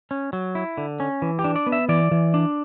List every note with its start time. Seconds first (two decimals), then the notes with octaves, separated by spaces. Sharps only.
0.11 C#4
0.33 F#3
0.55 E4
0.78 D3
1.00 C#4
1.22 E3
1.39 G4
1.44 D4
1.56 D5
1.67 B3
1.72 E5
1.89 E3 D5
2.11 E3
2.34 D4